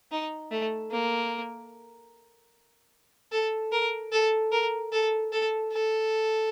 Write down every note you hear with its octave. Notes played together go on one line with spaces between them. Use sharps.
D#4
A3
A#3
A4
A#4
A4
A#4
A4
A4
A4